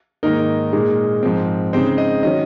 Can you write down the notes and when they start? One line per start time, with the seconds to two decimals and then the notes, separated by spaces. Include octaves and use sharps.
0.23 G#2 D#3 A#3 D#4 A#4
0.73 A#2 G#3 D#4
1.23 G#2 F3 C4
1.73 C#3 G#3 C4 D#4 C5
1.98 D#5
2.23 D#3 F#3 C#4 D#5